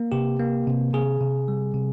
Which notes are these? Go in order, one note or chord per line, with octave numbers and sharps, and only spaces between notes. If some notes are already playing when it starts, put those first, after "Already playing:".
Already playing: A#3
C3 G4
A#3
C3
C3 G#4
C3
G3
C3